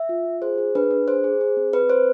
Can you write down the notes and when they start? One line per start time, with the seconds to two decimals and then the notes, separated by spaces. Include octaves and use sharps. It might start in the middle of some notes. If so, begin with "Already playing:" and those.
Already playing: E5
0.09 F4
0.25 F4
0.42 G#4 C5
0.58 G#4
0.75 D4 B4
0.91 D4
1.08 G#4 C5
1.24 G#4
1.41 G#4
1.57 C4
1.73 C4 B4
1.90 C4 C5